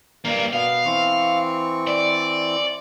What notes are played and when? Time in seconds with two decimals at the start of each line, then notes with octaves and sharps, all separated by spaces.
0.25 G2 A#3 A#4
0.53 B2 B3 F5
0.86 E3 C4 C#6
1.87 D5